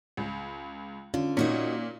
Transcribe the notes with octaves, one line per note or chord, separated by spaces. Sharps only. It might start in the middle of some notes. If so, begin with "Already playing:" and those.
C#2
D3 C#4 F4
A#2 D#4 F#4 C#5